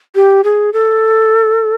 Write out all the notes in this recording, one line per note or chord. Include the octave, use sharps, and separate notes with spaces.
G4
G#4
A4